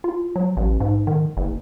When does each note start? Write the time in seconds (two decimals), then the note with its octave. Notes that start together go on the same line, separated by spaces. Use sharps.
0.04 F4
0.36 F#3
0.57 A1
0.80 G#2
1.07 D#3
1.37 F#1